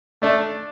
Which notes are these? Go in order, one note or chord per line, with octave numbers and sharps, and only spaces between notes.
A3 D4